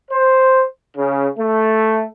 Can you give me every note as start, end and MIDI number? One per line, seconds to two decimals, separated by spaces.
0.11 0.63 72
0.96 1.27 49
1.38 2.04 57